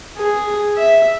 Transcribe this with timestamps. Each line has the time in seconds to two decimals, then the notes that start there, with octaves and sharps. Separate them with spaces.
0.17 G#4
0.77 E5